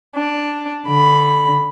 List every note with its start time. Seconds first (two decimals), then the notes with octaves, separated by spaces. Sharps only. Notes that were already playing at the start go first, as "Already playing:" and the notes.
0.15 D4
0.87 D3 B5